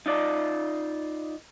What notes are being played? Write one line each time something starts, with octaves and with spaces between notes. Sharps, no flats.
D#4 F4 D5